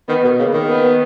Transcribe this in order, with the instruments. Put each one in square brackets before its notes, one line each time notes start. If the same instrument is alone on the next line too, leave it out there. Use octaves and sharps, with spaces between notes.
[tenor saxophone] D#3 [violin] B3
[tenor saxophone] B2
[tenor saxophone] C#3 [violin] A#3
[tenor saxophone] D#3
[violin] B3